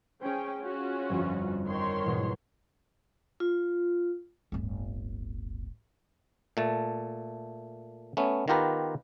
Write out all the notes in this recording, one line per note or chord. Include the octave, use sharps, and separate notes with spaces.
C#4 G#4 C5 G5
C#4 F4 F#4
G1 F2
D#3 C#5 C6
E2 G#2 B2
F4
D1 G1
A#2 A3 A5
A3 B3 C#4
D#3 B3 F4 G4 A#4 B4